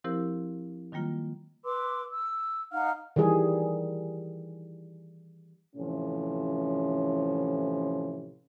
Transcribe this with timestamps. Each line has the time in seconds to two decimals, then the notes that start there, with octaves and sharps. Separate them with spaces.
0.04 F3 C4 E4 G4 A#4 C5
0.92 D#3 F#3 G3 A#3 F4
1.65 B4 C6 D6 E6
2.09 E6
2.72 D#4 F5 F#5 F6
3.16 D#3 E3 G3 G#4
5.76 A2 C3 E3 F3 C#4